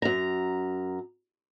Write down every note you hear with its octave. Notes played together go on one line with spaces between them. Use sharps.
F#2 A#5